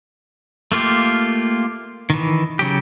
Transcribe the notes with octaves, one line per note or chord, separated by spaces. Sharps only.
A3 A#3 F4 G4
D#3 E3
C#3 F#3 G4